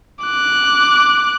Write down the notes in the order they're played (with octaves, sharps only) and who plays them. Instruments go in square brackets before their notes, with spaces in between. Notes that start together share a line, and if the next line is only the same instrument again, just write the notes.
[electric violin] D6 F#6